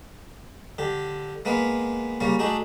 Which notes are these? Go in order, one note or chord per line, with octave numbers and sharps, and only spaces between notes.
D3 G4
G#3 A#3 B3 B4
C#3 G3 A#3 C#5
A3 D4 D#4 F#4 G#4